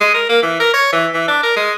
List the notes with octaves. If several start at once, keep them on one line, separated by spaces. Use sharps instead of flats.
G#3
A#4
A#3
E3
A#4
C#5
E3
E3
D4
A#4
G#3